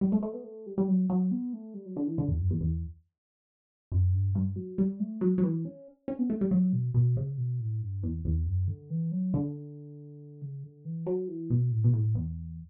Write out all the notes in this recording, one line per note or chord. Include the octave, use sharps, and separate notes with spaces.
G3
A3
A3
B3
A3
G3
G3
F#3
F#3
B3
A3
G3
F#3
D3
E3
D3
E2
F#2
E2
E2
F#2
G2
G2
F#3
G3
A3
F#3
F#3
E3
C#4
C#4
B3
A3
G3
F#3
B2
B2
C#3
B2
A2
G2
E2
E2
F#2
D3
E3
F#3
D3
C#3
D3
E3
F#3
E3
B2
A2
B2
A2
E2